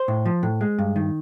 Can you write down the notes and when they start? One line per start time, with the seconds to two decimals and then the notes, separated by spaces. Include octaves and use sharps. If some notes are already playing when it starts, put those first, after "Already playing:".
Already playing: C5
0.08 A2
0.26 F3
0.43 A2
0.61 G#3
0.78 G2
0.96 D#3